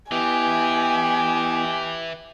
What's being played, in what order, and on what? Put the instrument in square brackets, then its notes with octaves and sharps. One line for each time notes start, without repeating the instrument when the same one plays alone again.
[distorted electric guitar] E3 [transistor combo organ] B3 E4 D#5 [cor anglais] G4 [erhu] G#5